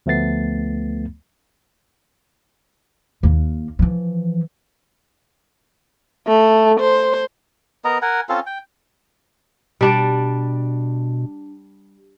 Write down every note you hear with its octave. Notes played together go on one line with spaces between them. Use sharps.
D2 F3 A3 B3 A6 C7
D#2 A#3
E3 F3
A3
C5
B3 A#4 D#5 A#5
A#4 F#5 G#5
C4 C#4 F4 A4
G5
B2 G3 D4 D5